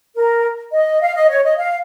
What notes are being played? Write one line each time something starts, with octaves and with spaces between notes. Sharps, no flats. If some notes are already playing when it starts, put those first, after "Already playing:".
A#4
D#5
F5
D#5
C#5
D#5
F5